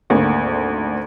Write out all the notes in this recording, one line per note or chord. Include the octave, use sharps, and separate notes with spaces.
G#1 D2 A#3